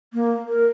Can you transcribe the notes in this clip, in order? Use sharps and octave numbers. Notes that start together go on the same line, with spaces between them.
A#3
A#4